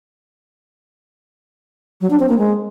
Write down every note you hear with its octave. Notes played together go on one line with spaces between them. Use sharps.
F#3
D4
C4
A#3
G#3